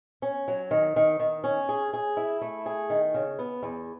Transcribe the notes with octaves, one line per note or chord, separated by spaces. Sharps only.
C#4
F#3
D#3
D#3
D#3
C#4
G#4
G#4
E4
A3
G#4
D#3
C#3
B3
E2